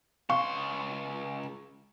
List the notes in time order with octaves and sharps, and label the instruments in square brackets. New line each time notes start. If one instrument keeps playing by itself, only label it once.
[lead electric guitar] C#2 C6 [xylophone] F5 [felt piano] C#6